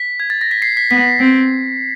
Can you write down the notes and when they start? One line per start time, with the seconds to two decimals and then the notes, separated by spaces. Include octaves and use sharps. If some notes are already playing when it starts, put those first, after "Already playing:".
Already playing: B6
0.20 G#6
0.30 A6
0.41 A#6
0.51 B6
0.62 C7
0.77 B6
0.91 B3 B6
1.20 C4